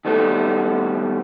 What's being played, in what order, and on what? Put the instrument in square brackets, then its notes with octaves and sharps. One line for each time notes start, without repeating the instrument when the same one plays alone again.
[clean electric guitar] D#3 G3 A3 B3 A4